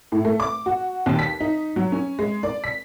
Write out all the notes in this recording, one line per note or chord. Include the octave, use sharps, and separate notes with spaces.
A2
A3
D6
F#4
D#2
B6
D#4
F#3
C#4
G#3
D5
B6